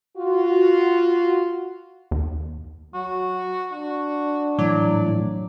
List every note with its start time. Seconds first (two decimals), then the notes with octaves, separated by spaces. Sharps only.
0.17 F4 F#4
2.11 D#2
2.94 F#3 F#4
3.73 D4 F#4
4.59 A2 E3 F#3 D5